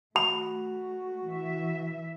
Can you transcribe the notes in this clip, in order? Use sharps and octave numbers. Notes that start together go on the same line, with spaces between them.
A3 F#4 B5
E3 E5